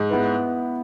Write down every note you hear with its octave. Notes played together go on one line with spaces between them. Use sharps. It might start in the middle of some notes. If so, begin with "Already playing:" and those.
Already playing: G#2
B3 E4 B4